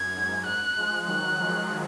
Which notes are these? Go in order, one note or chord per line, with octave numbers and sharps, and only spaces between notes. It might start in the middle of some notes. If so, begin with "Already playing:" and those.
Already playing: F#2 G#6
G#2
F#6
F3 G#3
D#3 F#3 F#6
F3 G#3